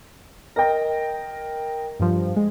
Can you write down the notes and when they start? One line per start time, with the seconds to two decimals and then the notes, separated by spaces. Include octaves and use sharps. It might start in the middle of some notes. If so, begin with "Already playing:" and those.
0.56 A#4 D#5 G5 A#6
1.99 G2 F3
2.36 G#3